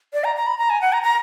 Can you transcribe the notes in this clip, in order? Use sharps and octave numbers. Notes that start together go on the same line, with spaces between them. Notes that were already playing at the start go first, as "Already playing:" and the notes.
D5
A#5
A#5
B5
A#5
G#5
F#5
A#5
A#5